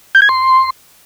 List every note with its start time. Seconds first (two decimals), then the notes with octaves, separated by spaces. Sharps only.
0.15 G6
0.22 G#6
0.29 C6